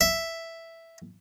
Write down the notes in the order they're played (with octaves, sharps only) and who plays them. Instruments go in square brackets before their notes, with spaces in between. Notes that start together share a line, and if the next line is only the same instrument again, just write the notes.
[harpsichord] E5